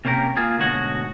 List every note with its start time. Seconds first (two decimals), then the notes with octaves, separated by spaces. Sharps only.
0.05 C3 A#3 C#4 G4 A#4
0.37 A#3 F4 G#4
0.59 D2 G#2 B2 F#4 C#5 D#5